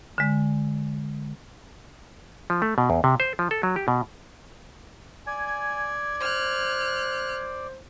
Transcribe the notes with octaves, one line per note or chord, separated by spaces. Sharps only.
D3 G#3
F3
A3
B2
E2
C3
C5
F3
A4
F#3
G4
B2
D5 G#5 G#6
C5 F6 F#6